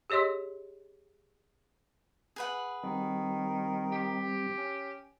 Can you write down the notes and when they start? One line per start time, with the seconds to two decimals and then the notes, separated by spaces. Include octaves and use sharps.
0.10 G4 G#4 C#5 D#5 C6
2.36 G#4 B4 F#5
2.84 D#3 G3 C4
3.92 G4
4.58 C#4